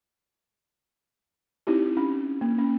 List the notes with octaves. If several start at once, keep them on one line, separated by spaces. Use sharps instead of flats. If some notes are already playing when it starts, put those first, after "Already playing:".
C4 D#4 E4 G4
C#4
A#3
C#4